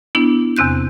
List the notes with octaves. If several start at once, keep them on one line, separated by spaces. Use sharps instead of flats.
B3 D4 E4
E2 C3 C4 F#6 G6